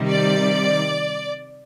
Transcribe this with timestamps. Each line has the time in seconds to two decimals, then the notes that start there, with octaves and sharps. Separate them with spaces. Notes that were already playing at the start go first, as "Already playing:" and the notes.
Already playing: C3 D#3 G3
0.09 D5